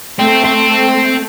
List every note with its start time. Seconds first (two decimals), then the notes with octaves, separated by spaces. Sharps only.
0.19 A3 C4
0.45 C4